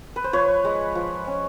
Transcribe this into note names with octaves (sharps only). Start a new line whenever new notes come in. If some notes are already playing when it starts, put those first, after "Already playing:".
B4
C5
F3 B4 C#5
G#3
F3
C#4